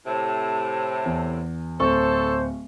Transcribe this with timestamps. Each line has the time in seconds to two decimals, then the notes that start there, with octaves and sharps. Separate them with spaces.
0.07 A2 C3 A5
1.06 E2
1.80 D1 A4 C5 C#6